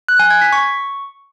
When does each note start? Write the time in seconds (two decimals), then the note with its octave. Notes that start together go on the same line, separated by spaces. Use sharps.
0.08 F#6
0.19 G#5
0.30 G#6
0.41 B6
0.52 C#6